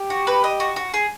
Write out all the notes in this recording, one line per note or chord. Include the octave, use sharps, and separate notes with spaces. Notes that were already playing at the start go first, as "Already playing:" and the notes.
Already playing: G4
F#4
B4
D#5
F#4
F#4
G#4